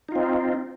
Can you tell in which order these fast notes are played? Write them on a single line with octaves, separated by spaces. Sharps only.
D#4 F4 C4